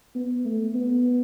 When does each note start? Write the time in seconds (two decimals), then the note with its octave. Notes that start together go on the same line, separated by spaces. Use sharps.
0.15 B3
0.45 A3
0.75 B3